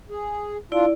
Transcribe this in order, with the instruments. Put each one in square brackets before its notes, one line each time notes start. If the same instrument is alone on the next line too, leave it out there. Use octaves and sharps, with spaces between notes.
[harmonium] G#4
[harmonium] D4 F4 [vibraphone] E4 D5